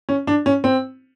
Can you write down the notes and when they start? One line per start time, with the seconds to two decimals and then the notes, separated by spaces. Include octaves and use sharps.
0.09 C#4
0.27 D4
0.46 C#4
0.64 C4